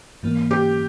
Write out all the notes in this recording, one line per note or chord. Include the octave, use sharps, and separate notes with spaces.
G#2 E3 A#3
G4